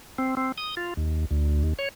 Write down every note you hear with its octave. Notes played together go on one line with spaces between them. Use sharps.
C4
C4
D#6
F4
D#2
D2
D#2
C#5